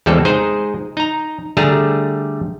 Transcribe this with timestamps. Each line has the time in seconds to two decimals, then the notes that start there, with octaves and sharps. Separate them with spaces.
0.06 E2 C#3 G3 G#3 C4 A4
0.25 G#3 D#4 G#4 C5
0.97 D#4 A#5
1.57 D3 G3 A3 G#4 A5 A#5